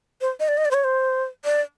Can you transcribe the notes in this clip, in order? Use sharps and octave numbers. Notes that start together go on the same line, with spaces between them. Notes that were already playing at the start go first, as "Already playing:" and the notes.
C5
D#5
D5
D#5
D5
C5
C#5
C5
D5